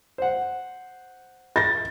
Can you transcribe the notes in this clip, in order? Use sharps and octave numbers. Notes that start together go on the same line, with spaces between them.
C5 F#5
A6 A#6